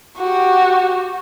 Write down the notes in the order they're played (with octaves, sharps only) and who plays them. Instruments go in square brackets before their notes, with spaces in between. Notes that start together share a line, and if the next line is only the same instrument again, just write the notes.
[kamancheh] F#4 G4